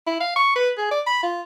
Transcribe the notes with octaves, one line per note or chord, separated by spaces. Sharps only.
E4
F5
C#6
B4
G#4
D5
B5
F4